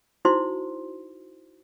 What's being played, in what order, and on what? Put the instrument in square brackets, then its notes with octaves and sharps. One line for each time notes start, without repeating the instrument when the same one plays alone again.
[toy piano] D#4 E4 F#4 C5 C6